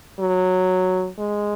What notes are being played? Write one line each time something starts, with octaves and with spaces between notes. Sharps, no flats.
F#3
G#3